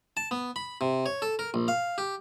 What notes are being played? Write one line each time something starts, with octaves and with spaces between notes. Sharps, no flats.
A5
B3
B5
C3
C#5
A4
A#4
A#1
F5
G4